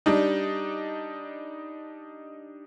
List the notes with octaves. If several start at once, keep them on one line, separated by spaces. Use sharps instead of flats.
G3 D4 D#4